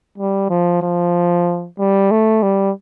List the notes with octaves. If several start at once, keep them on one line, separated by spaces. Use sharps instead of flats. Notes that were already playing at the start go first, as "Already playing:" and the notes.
G3
F3
F3
G3
A3
G3